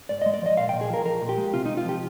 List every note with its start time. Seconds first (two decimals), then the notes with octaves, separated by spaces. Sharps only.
0.09 G#2 D5
0.22 D#5
0.26 G#3
0.34 D5
0.42 F3 D#5
0.57 A#2 F5
0.69 G5
0.74 A#2
0.81 G#4
0.89 F3 A#4
1.05 F3 A#4
1.22 A#2
1.29 G4
1.37 G#3
1.53 C3 F4
1.66 D#4
1.69 C3
1.77 F4
1.85 F3 G4